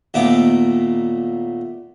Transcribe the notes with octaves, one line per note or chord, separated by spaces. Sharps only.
D#2 A#2 A3 B3 D6